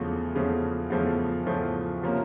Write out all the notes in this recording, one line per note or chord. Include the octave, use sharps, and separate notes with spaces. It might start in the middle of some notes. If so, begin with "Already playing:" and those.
Already playing: E2 C#3 F3 A3
E2 C#3 F3 A3
E2 C#3 F3 A3
E2 C#3 F3 A3
C3 F3 A#3 C#4